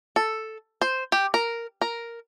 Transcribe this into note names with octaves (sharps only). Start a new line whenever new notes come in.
A4
C5
G4
A#4
A#4